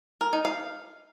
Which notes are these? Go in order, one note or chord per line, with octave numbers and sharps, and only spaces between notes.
A#4
D#4
F5